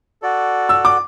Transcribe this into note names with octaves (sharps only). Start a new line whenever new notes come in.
F#4 A4 D5
E6
D6